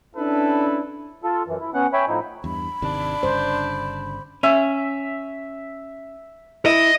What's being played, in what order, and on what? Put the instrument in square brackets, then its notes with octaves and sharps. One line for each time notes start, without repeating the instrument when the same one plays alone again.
[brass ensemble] C#4 D4 E4 A4 B4
[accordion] F4 A4
F#2 E3
E4
B3 C#4 F#5
C#5 E5 G5 G#5 B5
A2 F3 D#4 E4
[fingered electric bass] E2 G2 [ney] B5
[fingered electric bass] G#1 C3 D#3 [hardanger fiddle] D4
[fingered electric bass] G1 G2 C#3 [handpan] C5
[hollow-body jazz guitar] C#4 [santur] E5
[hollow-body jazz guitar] E4 [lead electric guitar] D#5